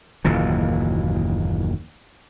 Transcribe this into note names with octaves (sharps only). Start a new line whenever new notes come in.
F#1 D#2 A#2 E3